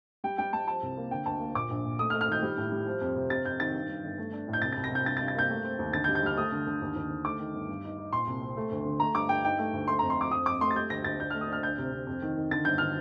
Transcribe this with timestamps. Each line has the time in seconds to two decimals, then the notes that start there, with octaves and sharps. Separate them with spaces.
0.24 G3 G5
0.38 G3 G5
0.53 G3 A5
0.68 F3 A5
0.83 C2
0.97 A#3
1.11 D3 G5
1.26 D2 A5
1.40 A#3
1.55 A#2 D6
1.70 A#1
1.85 A#2
1.99 A3 D#6
2.10 F6
2.13 A3
2.21 F6
2.28 D#3 G6
2.43 G3
2.57 A2
2.72 G3
2.86 F3
3.01 F2
3.16 C3
3.30 C3 A6
3.45 F2 G6
3.60 D#3 A6
3.74 G2
3.89 G2
4.04 G1
4.18 A3
4.33 D4
4.48 A2
4.53 G6
4.62 C2 A6
4.72 A6
4.77 C2
4.84 A#6
4.91 C2 G6
5.06 G2 A6
5.17 A6
5.21 G2
5.28 A6
5.35 A#3 G6
5.50 A3
5.64 C4
5.79 D#2
5.93 D3 A6
6.04 G6
6.08 G3
6.15 G6
6.23 G3 F6
6.37 A3 D#6
6.52 D3
6.67 D3
6.82 D#2
6.96 D#2
7.10 D3
7.25 A3 D6
7.39 D#3
7.54 G1
7.69 G2
7.84 D#4
7.98 D#4
8.12 A#2 C6
8.27 C2
8.41 C4
8.57 A3
8.71 D2
8.85 D3
9.00 A3 A#5
9.15 G2 D6
9.29 G2 G5
9.44 D#4 G5
9.59 A3
9.73 D2
9.88 A3 C6
9.99 A#5
10.02 F2
10.10 C6
10.18 F3 D6
10.31 F2 D#6
10.46 F2 D6
10.61 A3 C6
10.71 A6
10.75 G3 G6
10.90 D2 A#6
11.04 D2 A6
11.19 D4 G6
11.30 F6
11.34 A3
11.41 D#6
11.48 D4 F6
11.63 D2 G6
11.78 C3
11.93 C3
12.07 F2
12.22 D#3
12.36 D#3
12.51 D3 A6
12.65 G1 G6
12.78 D3 F6